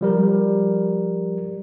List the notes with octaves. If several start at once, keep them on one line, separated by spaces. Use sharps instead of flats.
F3 G3 A#4